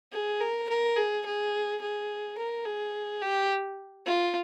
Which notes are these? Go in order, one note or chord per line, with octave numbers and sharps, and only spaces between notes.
G#4
A#4
A#4
G#4
G#4
G#4
A#4
G#4
G4
F4